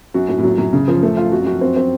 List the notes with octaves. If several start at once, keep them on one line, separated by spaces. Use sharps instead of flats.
F#2 F#4
A2 F#4
A2
A#2 F#3
F#2 F#3
C#3
F3
A3
F4
F2 F#4
F#2
F#4
F2
C4
C4